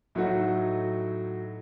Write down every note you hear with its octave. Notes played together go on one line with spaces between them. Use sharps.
A2 F#3 A3 D#4 F#4